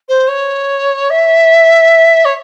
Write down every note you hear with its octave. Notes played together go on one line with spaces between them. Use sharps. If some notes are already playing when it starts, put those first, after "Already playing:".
C5
C#5
E5
C#5